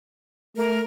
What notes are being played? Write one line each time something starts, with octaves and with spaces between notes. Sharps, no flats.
A3 A#4